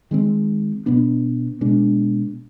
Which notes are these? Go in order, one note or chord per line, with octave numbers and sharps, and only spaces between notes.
D#3 G#3 C4
B2 B3 D4
B2 G#3 D4